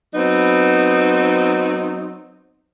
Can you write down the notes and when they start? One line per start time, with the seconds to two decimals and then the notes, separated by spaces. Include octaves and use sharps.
0.14 F#3 B3 C4 D#4